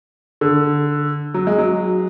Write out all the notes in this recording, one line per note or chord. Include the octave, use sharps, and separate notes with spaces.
D3
F#3
G#3
F#3